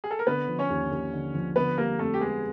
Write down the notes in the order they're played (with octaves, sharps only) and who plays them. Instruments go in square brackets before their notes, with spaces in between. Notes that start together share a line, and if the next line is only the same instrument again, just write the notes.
[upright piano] G#4
A4
A#4
[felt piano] D3 [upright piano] B3 B4
[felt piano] F3
[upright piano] C#4 C#5
[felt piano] D#2
D#2
D3
F3
[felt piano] D3 [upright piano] B3 B4
[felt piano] G3 [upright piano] A#3 A#4
[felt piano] F2 [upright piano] A3 A4
[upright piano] G4
[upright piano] G#3 G#4 [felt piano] B3